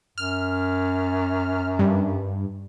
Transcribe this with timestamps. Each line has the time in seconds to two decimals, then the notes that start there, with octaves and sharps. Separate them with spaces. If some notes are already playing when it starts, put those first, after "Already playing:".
0.18 F#2 F6
1.79 G2